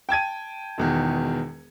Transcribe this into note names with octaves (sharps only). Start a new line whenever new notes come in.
G5 A5 G#6 D#7
E1 E2 D#3